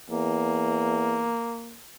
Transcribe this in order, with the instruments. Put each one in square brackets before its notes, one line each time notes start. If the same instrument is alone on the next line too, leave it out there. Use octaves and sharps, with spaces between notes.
[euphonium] E2 [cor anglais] A#3